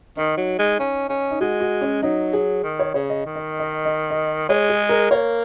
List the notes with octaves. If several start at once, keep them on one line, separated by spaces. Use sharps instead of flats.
D#3 D#4
F#3
G#3
C#4
C#4
D#4
G#3 F#4
F#4
C#4
F#3 D#4
G#4
D#3
C#5
C#3 C#5
D#5
D#3
D#5
D#5
D#5
D#5
G#3 C#5
G#4
A#4
A#3 C#5